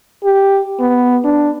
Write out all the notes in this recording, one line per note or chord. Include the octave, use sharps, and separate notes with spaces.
G4
B3
D4